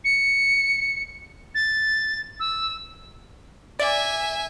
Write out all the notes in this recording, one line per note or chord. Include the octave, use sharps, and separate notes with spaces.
C#7
A6
E6
D5 E5 G#5